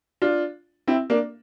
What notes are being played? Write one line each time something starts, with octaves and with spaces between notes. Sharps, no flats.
D4 F4
C4 E4
A#3 D4